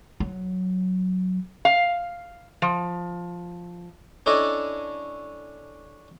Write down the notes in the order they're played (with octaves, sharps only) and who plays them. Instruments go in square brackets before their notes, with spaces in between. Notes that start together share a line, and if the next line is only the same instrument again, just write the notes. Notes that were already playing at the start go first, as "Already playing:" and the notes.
[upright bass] F#3
[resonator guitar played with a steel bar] F5
F3
[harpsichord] C#4 D4 E4 A4 D5 D#5